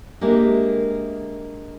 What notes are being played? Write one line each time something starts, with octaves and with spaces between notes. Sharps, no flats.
G#3 A#3 D4 G4 E5